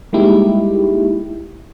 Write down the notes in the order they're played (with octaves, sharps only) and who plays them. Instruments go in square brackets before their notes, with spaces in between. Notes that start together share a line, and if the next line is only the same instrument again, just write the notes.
[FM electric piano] G3 G#3 A#3 D#4 E4 G4